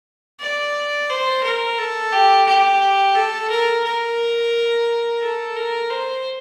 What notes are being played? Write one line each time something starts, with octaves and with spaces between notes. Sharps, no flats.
D5
C5
A#4
A4
G4
G4
A4
A#4
A#4
A4
A#4
C5